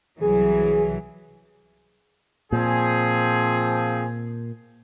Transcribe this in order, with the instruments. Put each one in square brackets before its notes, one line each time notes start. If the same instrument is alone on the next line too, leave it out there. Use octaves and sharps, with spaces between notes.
[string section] C2 E3 F#3 [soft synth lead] G#4
[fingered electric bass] A#2 [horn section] F3 C4 G#4